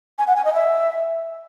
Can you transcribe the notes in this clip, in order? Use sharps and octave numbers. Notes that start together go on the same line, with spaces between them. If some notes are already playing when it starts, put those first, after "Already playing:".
G#5
F#5
G#5
D#5
E5